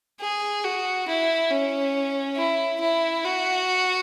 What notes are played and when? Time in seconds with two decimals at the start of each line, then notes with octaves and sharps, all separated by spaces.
0.21 G#4
0.65 F#4
1.08 E4
1.51 C#4
2.36 E4
2.80 E4
3.24 F#4